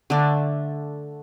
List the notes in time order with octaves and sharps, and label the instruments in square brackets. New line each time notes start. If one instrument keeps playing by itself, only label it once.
[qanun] D3 A3 D4